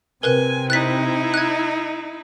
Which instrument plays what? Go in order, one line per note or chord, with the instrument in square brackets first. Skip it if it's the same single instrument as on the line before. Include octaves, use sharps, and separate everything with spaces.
[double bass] C3 C4 [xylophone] A#4 B4 F#6 [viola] G#5
[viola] D#4 E4 [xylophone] F#6 A6 B6
[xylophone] F#6 G#6